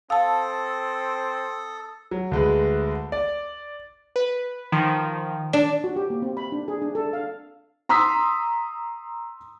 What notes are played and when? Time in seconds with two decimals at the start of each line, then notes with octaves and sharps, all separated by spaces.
0.10 C4 A4 F5 A5 D#6
2.11 F#3
2.31 D2 G#3 B4
3.12 D5
4.16 B4
4.72 D#3 F3
5.53 D4
5.84 F#4
5.96 G4
6.10 A#3
6.22 C4
6.37 B5
6.52 D4
6.68 G#4
6.82 D4
6.95 A4
7.13 F5
7.89 A#5 C6 D#6 E6 B6